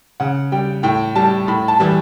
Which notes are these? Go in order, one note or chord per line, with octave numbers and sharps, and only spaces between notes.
C#3 F#5
G3 G5
A2 G5
G3 A5
A2 B5
A5
E3 G3